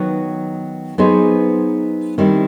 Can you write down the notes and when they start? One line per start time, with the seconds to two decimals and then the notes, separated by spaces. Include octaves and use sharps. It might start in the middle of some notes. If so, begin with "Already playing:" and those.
Already playing: D#3 F#3 B3 D#4
0.98 F#3 B3 D#4 G#4 C5
2.18 D#3 G3 C4 E4